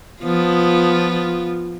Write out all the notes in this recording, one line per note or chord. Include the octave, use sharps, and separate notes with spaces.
F3 B3 F4